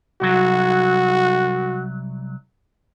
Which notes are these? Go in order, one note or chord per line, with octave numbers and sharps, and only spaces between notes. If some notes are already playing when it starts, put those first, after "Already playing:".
C2 F#3 F#4